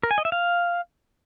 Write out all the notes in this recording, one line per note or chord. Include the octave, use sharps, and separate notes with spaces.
A#4
G#5
D#5
E5
F5